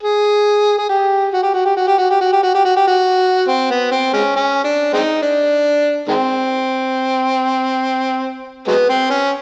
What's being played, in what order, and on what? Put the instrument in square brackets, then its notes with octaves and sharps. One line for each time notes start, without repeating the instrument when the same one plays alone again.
[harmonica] G#4
G#4
G4
F#4
G4
F#4
G4
F#4
G4
F#4
G4
F#4
G4
F#4
G4
F#4
G4
F#4
C4
B3
C4
G#3 C#4
C#4
D4
G#3 C4 D#4
D4
D#3 G#3 C4
F#3 G#3 B3
C4
C#4